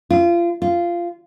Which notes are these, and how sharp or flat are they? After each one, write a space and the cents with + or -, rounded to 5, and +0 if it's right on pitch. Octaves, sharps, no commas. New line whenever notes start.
F4 -30
F4 -15